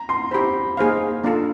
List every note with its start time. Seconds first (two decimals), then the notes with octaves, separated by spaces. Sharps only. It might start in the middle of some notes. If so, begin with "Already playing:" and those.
Already playing: A#5
0.09 C6
0.31 E4 G4 C5 B5
0.77 A#3 D#4 G#4 C5 F5
1.24 A#3 D4 F4 A4